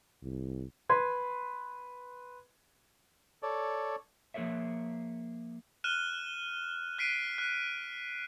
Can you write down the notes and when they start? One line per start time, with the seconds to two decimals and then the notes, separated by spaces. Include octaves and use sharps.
0.23 C2
0.89 B4 C6 G#6
3.43 A4 C#5 D5
4.34 F3 A#3 G#4 A#4 C#5 E5
5.84 F6 F#6 D#7 E7 G7
6.98 F#6 B6 C7 D7 D#7
7.38 F#6